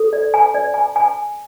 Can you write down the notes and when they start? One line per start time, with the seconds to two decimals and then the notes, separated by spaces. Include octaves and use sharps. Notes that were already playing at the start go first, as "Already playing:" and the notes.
Already playing: A4
0.13 D5
0.34 G#5
0.54 D5
0.74 G#5
0.96 G#5